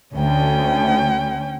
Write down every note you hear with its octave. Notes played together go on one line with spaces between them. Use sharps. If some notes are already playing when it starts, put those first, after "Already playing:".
D2 C#4 G5